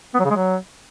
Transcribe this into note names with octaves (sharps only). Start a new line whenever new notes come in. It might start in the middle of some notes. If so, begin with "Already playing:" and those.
B3
F#3
C#3
G#3
F#3